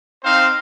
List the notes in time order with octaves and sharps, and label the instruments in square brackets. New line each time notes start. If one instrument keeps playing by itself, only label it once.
[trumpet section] C4 D#4 C5 F5